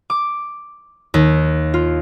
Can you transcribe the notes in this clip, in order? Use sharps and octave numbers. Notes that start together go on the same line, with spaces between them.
D6
D#2
F4